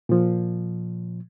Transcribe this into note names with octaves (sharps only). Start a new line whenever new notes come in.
A#2 F3